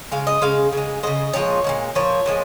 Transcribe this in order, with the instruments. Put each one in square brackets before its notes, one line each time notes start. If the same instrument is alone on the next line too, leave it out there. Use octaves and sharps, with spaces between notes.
[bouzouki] C#3 G#3 F5
D#5
C#3 G#3 F5
C#3 G#3
C#3 G#3 D#5
A#2 F3 G#3 C#5
A#2 F3 G#3
A#2 F3 C#5
A#2 F3 G#3